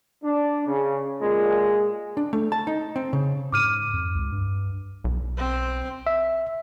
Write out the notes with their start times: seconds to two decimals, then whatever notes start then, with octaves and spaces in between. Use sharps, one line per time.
0.24 D4
0.67 C#3
1.22 A#2 G#3
2.17 D4
2.33 A3
2.52 A5
2.67 D#4
2.96 C4
3.13 C#3
3.52 G#2 D6 F6 D#7
3.93 F2
4.15 C#2
4.32 G2
5.04 B1
5.38 C4
6.07 E5